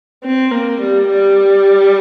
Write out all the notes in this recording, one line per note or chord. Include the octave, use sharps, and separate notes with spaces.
C4
A#3
G3
G3